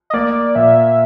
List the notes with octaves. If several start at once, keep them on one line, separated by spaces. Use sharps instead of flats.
D#5
A#3 D5
A#2 E5